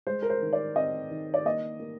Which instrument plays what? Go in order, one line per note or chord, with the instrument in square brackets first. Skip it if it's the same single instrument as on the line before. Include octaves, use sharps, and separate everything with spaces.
[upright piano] G#3 C5
A#4
C5
D#3
D5
C4 D#5
D#3
D5
A#3 D#5
A#3